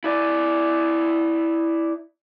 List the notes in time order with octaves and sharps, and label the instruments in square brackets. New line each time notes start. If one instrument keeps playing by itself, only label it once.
[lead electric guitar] E4 D5